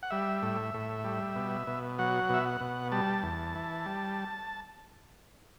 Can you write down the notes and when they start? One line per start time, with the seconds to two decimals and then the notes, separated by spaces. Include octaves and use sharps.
0.03 F#5
0.11 G3 E5
0.42 A2
0.74 A2
1.04 G3
1.36 B2
1.67 B2
1.99 F#3 F#5
2.29 B2 E5
2.46 F#5
2.61 B2
2.92 G3 A5
3.23 E2
3.55 E3
3.86 G3